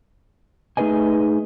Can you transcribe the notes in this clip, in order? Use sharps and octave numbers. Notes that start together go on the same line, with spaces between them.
A3 D#4 G#4 B4 D#5 G#5